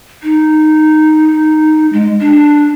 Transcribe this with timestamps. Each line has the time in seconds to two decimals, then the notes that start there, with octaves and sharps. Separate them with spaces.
0.23 D#4
1.93 G#3
2.21 D4